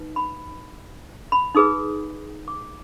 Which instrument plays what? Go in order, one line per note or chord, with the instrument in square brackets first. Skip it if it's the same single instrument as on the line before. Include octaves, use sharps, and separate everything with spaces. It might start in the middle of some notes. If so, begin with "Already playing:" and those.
Already playing: [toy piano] D#4 B4
B5
B5
D#4 G#4 B4 D#6
D6